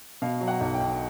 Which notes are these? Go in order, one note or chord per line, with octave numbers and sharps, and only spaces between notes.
B2 F5
F#3
F#5
B1
G5
B1